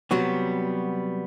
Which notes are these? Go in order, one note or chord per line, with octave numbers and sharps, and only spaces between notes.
C3 F#3 G3 B3 F#4